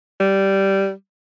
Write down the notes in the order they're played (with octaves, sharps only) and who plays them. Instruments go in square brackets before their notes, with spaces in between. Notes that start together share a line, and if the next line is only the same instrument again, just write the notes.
[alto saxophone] G3